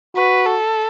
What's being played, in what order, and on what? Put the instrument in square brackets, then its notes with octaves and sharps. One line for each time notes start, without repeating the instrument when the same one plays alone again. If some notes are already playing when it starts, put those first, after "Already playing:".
[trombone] F#4 [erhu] B4
[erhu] A4